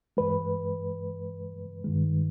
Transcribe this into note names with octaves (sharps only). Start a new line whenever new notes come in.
G2 E3 G#3 B4
G2 D#3 G#3